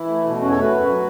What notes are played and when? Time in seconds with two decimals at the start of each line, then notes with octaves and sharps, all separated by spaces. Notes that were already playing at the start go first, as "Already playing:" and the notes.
Already playing: E3 E4
0.08 A3
0.24 B2
0.40 E2 C#4 F#4
0.50 A4 C#5
0.56 A3 F#4 B4
0.71 F#2
0.87 F#3